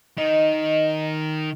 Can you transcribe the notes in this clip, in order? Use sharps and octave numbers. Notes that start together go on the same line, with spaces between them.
D#3 D#5